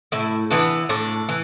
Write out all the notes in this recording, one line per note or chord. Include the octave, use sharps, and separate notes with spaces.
A2 E4
E3 B3 D4
A2 D4
E3